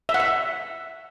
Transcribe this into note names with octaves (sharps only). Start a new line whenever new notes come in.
E5
F#5
E5